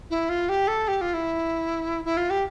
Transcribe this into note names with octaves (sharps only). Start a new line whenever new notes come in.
E4
F4
G4
A4
G4
F4
E4
E4
F4
G4